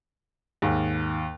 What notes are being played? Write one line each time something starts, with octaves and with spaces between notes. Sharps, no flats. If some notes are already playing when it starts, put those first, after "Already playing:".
D#2 G#2